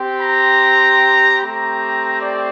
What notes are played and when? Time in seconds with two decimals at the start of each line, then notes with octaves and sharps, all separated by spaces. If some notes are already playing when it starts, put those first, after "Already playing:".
Already playing: C4 G4
0.21 A#5
1.41 A3 C4 G4 A#5
2.21 D5